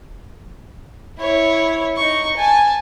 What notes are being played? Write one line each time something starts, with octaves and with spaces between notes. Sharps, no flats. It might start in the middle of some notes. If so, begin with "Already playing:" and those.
E4 C#5
D#4 C#6
G#5 A5